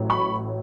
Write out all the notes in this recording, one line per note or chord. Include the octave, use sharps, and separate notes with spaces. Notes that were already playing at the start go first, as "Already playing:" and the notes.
Already playing: A1 A2 F#3
B5 C#6